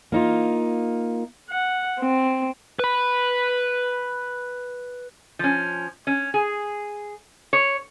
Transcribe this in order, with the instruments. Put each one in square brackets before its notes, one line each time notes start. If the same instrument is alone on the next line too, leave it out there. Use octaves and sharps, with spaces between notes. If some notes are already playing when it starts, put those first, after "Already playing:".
[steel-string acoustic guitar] A#3 D#4 F4
[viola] F#5
C4
[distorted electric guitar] B4 B5
[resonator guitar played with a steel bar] F3 C#4
C#4
G#4
C#5